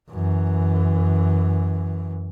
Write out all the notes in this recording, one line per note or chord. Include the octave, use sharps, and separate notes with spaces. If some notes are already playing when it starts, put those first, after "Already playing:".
F#2 E3